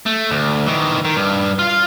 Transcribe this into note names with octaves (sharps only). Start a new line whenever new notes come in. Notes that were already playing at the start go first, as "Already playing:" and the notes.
A3
D2
D#3 E3
D#3
G2
F4 F5